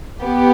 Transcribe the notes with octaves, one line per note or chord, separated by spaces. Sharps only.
B3 G4